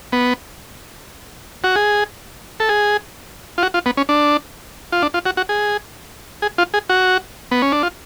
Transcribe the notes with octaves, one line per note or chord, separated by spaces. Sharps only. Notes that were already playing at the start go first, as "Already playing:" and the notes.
B3
F#4
G#4
A4
G#4
F4
F#4
F4
B3
C#4
D4
F4
D4
F4
F#4
F#4
G#4
G#4
F4
G#4
F#4
B3
C#4
D4
F4